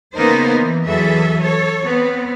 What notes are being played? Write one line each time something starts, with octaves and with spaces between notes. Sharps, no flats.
C#3 A#3 B3 D#4 A#4 C5
E3
E2 E3 F#3 G#4 A4 E5
A4 C#5
B3 C4